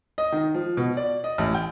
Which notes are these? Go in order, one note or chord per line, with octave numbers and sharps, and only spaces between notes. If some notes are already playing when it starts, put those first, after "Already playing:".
D#5
D#3
F3
B2
D5
D#5
A1
G5